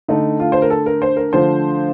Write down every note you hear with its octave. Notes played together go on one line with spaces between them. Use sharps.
D3 A3 D#4
F4
C5
A#4
A4
A#4
C5
A#4
D3 F3 A3 C5